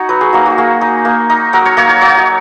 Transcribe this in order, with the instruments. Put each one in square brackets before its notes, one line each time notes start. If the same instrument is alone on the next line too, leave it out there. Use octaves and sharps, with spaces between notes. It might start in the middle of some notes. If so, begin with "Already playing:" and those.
Already playing: [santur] D#4 F#4 C#5
F#3 B4
G#4
A#3 D#4 F#4
F#4
A#3 G#4
D#4
A#3
D#4
F#3 A#4
C#5
A#3 D#4 C#5
C#5
F#3 C#5
D#5